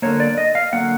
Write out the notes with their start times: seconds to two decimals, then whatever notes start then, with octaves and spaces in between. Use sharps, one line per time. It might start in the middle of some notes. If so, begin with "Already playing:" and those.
0.02 D3 F#3 A#3 C#5
0.20 D5
0.38 D#5
0.55 F5
0.73 D3 F#3 A#3 F#5